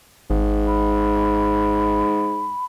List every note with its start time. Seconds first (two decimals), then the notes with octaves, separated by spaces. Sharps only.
0.30 G#1 G#2
0.67 B5